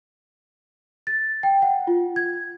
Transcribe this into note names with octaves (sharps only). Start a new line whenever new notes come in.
A6
G5
F#5
F4
G#6